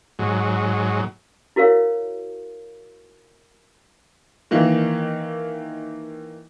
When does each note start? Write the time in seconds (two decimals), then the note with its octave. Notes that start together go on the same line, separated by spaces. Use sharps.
0.19 G#2 F#3
1.56 E4 F#4 A#4 C#5 F5
4.51 D#3 E3 A#3